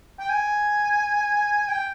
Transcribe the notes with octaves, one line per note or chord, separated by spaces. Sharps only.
G5
G#5
G5